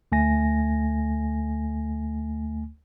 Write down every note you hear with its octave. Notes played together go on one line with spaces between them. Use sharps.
D2 A3 G#5 A#6